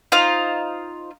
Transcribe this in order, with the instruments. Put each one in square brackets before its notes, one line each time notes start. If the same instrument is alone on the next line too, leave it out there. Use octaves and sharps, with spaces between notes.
[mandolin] D#4 F4 C5 F5